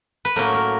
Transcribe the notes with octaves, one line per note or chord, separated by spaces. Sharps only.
B4
A2 F#3 A#3 C#4 A#4
A#4